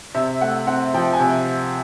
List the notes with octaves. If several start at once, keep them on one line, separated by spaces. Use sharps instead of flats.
C3 E5
A3 F#5
C4 F#5
F3 G5
G#5
C3